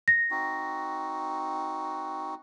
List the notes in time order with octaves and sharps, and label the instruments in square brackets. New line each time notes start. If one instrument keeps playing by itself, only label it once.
[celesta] A#6
[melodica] C4 D#4 F#4